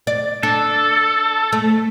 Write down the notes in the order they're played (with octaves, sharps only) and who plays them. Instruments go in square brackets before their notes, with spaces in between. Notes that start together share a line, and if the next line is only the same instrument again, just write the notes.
[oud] D5
[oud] D4 [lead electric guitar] A4
[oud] A3